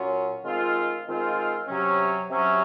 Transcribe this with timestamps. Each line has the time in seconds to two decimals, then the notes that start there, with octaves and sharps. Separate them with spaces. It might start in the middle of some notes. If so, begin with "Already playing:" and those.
Already playing: A#2 F#3 C#4 F4
0.43 D#3 G#3 C4 F4
1.06 D#3 G#3 C4 F4
1.67 C3 F#3 C#4
2.30 C3 F#3 C#4